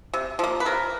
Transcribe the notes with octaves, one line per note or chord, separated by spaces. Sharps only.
C3
F3 A#3
B4
C3 A#4